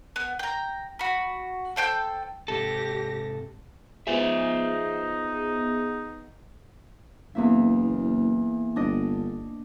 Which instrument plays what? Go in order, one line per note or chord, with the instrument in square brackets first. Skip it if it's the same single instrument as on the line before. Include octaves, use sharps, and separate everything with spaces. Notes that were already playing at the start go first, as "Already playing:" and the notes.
[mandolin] B3
G5 A#5
F#4 B5
A4 C5 G5 G6
[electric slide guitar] G#2 C3 A4 [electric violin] G4 A#6
[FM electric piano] B3 G#4 [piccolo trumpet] D#4 [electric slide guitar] F4 C5 E5
[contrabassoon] F#1 [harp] E2 A#3 E5
[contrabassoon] G1 [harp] D4 D#5